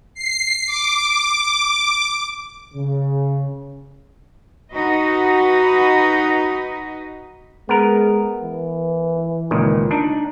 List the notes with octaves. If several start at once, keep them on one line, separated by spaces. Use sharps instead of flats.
C7
D6
C#3
D#4 F#4 B4 D#5
G#3 B3 A#4
E3
C#2 A#2 D#3
D4 D#4